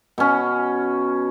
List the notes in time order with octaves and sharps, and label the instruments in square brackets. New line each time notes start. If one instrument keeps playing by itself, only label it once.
[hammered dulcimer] B2 C#4